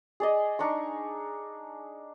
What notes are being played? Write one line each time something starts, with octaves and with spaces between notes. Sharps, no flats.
G#4 D5 D#5
D4 D#4 C#6